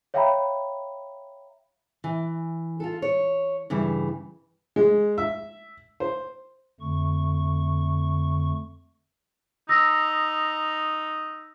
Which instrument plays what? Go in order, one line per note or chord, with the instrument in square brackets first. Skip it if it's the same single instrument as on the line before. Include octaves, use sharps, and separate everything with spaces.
[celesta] C#5 E5 F5 G5 A#5 B5
[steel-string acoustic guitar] E3
F4 A4
C#5
G2 C#3 E3
[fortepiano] G#3
E5
C5
[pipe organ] F2 D3 A3 C#6
[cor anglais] D#4 [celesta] D#6 E6 A#6